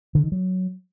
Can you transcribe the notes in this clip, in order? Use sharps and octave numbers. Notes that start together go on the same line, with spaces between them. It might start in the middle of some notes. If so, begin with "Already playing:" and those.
D3
D#3
F#3